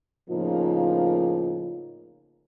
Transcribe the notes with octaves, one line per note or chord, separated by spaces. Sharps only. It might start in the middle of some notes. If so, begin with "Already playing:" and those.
A2 C#3 F3 A#3 D#4 F4